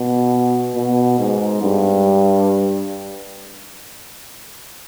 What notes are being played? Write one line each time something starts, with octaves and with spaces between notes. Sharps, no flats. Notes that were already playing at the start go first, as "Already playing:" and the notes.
Already playing: B2
B2
G#2
G2